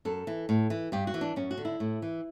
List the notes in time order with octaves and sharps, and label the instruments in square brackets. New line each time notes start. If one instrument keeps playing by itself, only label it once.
[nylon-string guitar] F#2 A4
E3
A2
E3
G2 G4
F#4
E3
D4
F#2 C#4
F#4
D3
E4
A2
E3